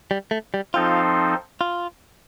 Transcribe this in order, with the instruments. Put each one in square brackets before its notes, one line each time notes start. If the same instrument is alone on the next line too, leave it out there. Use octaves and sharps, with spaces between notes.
[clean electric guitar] G3
A3
G3
[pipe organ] F3 C4 D#4 A4 C5 [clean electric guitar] F4
[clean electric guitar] F4